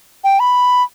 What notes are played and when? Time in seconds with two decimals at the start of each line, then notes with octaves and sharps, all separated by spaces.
0.24 G5
0.40 B5